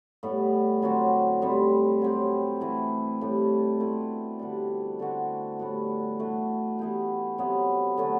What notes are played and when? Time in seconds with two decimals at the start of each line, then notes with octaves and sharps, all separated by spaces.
0.23 A2 G3 B3
0.82 D3 F#3 C4 F#4
1.42 A2 G3 C4
2.02 F#3 C4 G4
2.61 E3 A3 E4
3.21 A2 G3 D4 G4
3.80 B2 A3 C4 E4
4.39 D3 G3 D4
4.99 D3 A3 C4 F#4
5.59 A2 G3 B3 F#4
6.19 E3 A3 D4 F#4
6.79 E3 B3 E4 G4
7.38 C3 F#3 B3
7.97 D3 F#3 A3